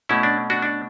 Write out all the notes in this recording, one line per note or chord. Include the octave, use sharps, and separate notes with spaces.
B2 A3 C#4 E4
D4
D4 F#4
D4